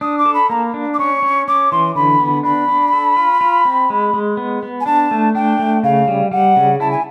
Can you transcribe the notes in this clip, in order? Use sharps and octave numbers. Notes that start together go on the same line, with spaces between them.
D4 D#6
D6
A4
B5
A#3 A#5
D4
D6
C#4 C#6
C#4
C#4 D6
E3 C6
D3 B5
B3
D4 B5
D4
A4
F4
F4
C4
G#3
G#3
B3
B3
G#5
D4 A5
A3
D4 G5
A3
C#3 F5
G3
G3 F#5
C#3
E4 A5
G#5